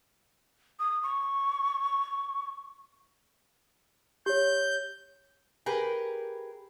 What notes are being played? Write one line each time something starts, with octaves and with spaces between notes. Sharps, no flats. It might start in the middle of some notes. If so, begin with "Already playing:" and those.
D#6
C#6
G4 C#5 G6
G4 G#4 A#4 B4